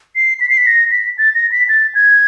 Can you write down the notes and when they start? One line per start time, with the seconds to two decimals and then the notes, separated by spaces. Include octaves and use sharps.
0.16 C7
0.40 B6
0.49 C7
0.57 B6
0.67 A#6
0.91 B6
1.18 A6
1.35 A#6
1.52 B6
1.69 A6
1.95 G#6